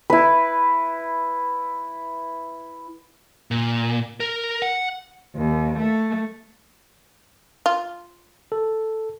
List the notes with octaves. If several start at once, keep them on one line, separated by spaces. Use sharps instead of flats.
E4 B4
A#2
A#4
F#5
D#2
A3
F4
A4